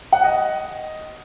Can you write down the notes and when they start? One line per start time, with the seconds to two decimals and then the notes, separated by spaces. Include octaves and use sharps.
0.12 F#5
0.24 D#5